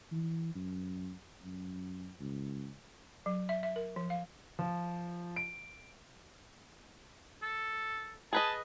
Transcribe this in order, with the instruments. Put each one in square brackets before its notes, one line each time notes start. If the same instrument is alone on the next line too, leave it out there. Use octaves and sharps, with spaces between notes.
[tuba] E3
F#2
F#2
C#2
[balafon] F#3
E5
E5
A#4
F3
F5
[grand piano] F3
D7
[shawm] A4
[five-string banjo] G#4 B4 D#5 [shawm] A5